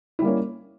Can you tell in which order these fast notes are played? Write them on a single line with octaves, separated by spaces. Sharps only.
E4 G3 A#3 C#4